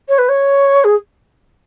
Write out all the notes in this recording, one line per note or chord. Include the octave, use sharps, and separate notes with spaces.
C#5
B4
C#5
G#4